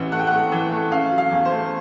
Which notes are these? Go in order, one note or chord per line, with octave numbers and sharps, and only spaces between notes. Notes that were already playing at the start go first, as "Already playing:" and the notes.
Already playing: A1 E3 F#5
A3 F#5
G5
A3 F#5
E3
A3
C#3 F5
F#3
F5
E2
C5
A3